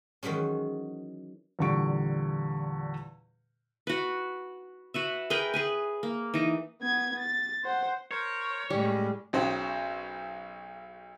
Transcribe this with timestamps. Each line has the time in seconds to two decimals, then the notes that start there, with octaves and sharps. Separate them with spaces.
0.23 D#3 E3 F#3 G#3 C#4
1.59 E2 A#2 D3 G3 C#6 D7
3.87 F#4 B4
4.94 F#4 B4 E5
5.30 G#4 A#4 B4 G5
5.54 G#4 B4 G#5
6.03 A#3
6.34 E3 D#4
6.82 B3 G#6
7.20 A6
7.64 C5 F#5
8.11 A#4 C5 C#5
8.70 A2 G3 G#3 C#4
9.33 B1 C#3 F#3 C5 G5